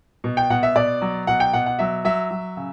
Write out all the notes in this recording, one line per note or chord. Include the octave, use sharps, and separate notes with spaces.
B2
G5
B2 F#5
E5
B2 D5
F#3
B2 F#5
G5
B2 F#5
F#5
F#3 E5
F#3 E5
F#3
C#3